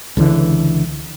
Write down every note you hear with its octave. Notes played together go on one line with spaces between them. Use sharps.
C#2 D3 E3